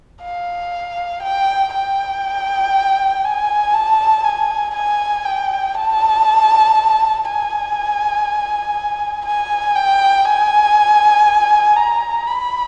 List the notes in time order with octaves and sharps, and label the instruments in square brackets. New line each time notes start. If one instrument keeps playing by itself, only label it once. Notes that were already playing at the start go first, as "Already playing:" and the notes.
[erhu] F5
G5
G5
G#5
A5
G#5
G#5
G5
A5
G#5
G#5
G5
G#5
A#5
B5